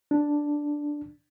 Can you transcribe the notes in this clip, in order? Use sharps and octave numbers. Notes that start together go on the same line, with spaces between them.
D4